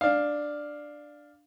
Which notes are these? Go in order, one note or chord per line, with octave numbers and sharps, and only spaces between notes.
D4 F5